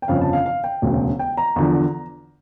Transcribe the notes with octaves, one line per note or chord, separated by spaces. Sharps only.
G5
G1 F2 C#3 F5
A5
F5
F5
G5
E1 D2 C#3
G5
A#5
E2 D3 F3